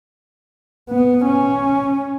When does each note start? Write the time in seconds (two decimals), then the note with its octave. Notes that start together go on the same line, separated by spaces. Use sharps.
0.90 B3
1.25 C#4